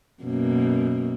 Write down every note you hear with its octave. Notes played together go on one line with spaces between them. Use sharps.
F#2 B2 A#3